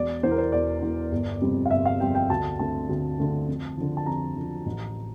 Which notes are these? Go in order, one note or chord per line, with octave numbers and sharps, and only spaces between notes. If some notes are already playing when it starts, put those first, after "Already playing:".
Already playing: E1 D5
E2 E3 C5
A#4
C5
E1 D5
E2 E3
G1
F2 C3 G3
F5
G1 E5
F5
F2 C3 G3 G5
G5
D2 A5
D3 A3 C4 A5
D2
D3 A3 C4
F2
D3 F3
A5
F2 A#5
D3 F3
A1